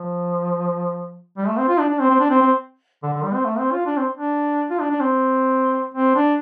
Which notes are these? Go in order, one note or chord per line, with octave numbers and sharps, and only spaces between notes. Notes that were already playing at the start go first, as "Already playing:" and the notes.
Already playing: F3
G3
A3
C4
F4
D4
D4
C4
C4
D4
C4
C4
D3
D3
G3
C4
A3
C4
F4
D4
C4
D4
F4
D4
D4
C4
C4
D4